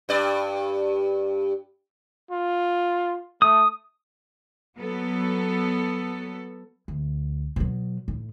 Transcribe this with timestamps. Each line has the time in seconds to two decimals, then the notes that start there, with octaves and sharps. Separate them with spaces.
0.09 G2 D5
2.31 F4
3.42 A3 D#6
4.77 F#3 B3 A4
6.88 D2
7.56 B2 F#3
8.08 A2